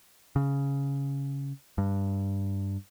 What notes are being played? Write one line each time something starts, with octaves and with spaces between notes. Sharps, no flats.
C#3
G2